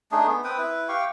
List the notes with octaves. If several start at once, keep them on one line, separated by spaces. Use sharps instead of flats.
A3 D4 D#4 G#4
B3
C4 B4 G5 D#6
E4 B4
G4 F5 G5 C#6